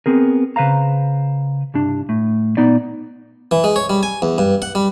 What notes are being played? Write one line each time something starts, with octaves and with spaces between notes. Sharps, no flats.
B3 C4 G#4 A#4
C#3 B4 C5 F5 A#5
C2 G2 D4
A2
A#2 B3 D#4 D5
E3
G#3
C#5
G3
G#5
E2
G2
F#5
G3